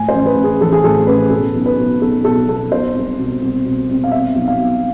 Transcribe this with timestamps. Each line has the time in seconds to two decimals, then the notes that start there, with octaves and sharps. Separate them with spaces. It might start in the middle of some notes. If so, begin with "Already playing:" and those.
Already playing: A2 G#5
0.08 C5
0.14 A1
0.26 B4
0.37 A1
0.44 G#4
0.61 E3 A4
0.72 G#4
0.84 A2 A4
1.07 A1 B4
1.30 B2 A4
1.55 B1
1.66 B4
1.78 B2
2.01 B1 A4
2.24 B2 A4
2.48 B1 A4
2.72 B2 C5
2.94 C2
3.19 B2
3.42 C2
3.65 B2
3.89 C2
4.04 F5
4.11 B2 E5
4.35 B1
4.48 F5
4.59 B2